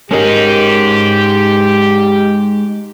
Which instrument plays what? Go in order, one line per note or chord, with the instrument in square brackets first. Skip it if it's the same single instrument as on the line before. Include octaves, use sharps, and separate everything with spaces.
[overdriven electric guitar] G#3 D#4 [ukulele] C#4 A#4 D#5 [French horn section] G4